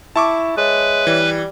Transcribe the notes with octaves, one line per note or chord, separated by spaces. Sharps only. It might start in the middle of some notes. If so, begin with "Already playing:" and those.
E4 A5 C#6 D6
G#3 B4 C#5 E5
E3 G3